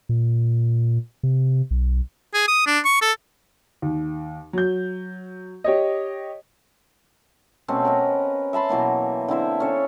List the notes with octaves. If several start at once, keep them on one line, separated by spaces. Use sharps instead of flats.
A#2
C3
B1
G#4
D#6
D4
C#6
A4
D#2
F#3 G6
G4 C#5 D#5
B2 A3 C4 C#4
A#4 B4 D#5
E5 A5 B5 C6
B2 E3 F#3 A#3
D3 C4 E4 C5
C#4 A4 C#5